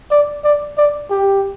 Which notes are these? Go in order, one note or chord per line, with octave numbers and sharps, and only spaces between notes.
D5
D5
D5
G4